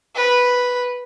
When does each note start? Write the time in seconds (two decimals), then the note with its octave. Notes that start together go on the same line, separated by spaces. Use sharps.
0.15 B4